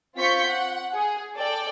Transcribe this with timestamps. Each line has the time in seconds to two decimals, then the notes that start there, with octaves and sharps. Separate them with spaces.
0.17 C4 F4 C#6 G6 B6 C#7
0.47 F#5
0.95 G#4
1.36 A4 D5 G5